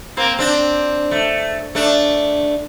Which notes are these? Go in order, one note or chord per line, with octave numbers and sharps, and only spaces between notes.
A#3 C4
C4 D4
A3
A3 D4